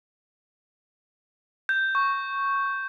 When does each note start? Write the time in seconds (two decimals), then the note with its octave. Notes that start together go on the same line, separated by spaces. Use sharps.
1.69 G6
1.95 C#6